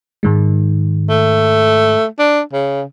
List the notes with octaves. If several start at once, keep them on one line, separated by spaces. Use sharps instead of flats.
G#2 D#3 G#3
A3
D4
C#3